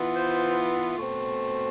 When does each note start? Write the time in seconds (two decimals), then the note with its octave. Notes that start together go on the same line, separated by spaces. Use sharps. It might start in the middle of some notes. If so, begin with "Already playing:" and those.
Already playing: E3 B3 F4
0.14 C5
0.96 B2 A3 C4